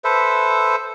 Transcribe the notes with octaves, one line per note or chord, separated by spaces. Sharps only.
A4 B4 C5 E5